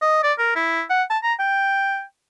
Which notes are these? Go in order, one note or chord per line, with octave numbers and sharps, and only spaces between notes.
D#5
D5
A#4
E4
F#5
A5
A#5
G5